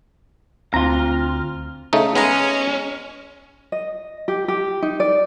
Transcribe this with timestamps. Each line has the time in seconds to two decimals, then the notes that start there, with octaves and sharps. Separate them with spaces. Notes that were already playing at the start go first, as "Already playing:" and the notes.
0.74 D2 C4 F4 A#5 F6
1.93 C#3 A3 D#4
2.15 G#3 B3 C#4 A#5
3.72 D#5
4.28 G4
4.48 G4
4.82 D#4
5.00 D5